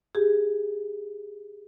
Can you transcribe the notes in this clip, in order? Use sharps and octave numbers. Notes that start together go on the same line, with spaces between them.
G4 G#4